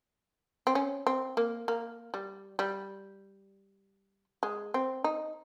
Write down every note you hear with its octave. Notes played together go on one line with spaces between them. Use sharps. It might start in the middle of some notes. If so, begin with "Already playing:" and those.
C4
C#4
C4
A#3
A#3
G3
G3
G#3
C4
D#4